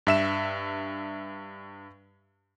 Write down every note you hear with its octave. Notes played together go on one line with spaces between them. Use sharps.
G2 E5 E7